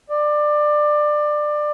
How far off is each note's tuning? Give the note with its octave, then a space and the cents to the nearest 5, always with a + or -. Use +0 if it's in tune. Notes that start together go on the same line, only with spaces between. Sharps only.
D5 +20